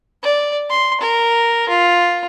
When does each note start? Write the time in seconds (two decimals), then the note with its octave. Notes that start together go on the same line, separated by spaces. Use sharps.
0.23 D5
0.70 C6
1.01 A#4
1.69 F4